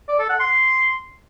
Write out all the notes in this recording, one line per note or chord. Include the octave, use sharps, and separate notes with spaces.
D5
A4
F#5
C6